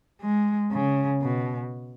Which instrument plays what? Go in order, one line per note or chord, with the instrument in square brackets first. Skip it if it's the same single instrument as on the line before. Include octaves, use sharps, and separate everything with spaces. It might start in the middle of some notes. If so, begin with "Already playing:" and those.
[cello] G#3
C#3
B2